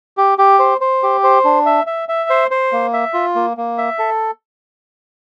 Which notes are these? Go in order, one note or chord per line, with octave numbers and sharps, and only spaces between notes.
G4
G4
C5
C5
G4
C5
D4
E5
E5
E5
C5
C5
A#3
E5
F4
A#3
A#3
E5
A4